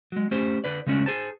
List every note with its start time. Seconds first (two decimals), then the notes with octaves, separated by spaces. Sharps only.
0.12 F#3 G#3
0.31 A3 C#4 G4 C5
0.64 D3 B4 D5
0.86 C#3 G#3 A3 C#4 D4
1.06 G#4 C5 A5